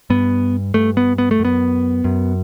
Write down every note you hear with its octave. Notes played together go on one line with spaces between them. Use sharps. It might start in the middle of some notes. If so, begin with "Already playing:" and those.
G2 B3
G2 A3
B3
B3
A3
F#2
B3
F#2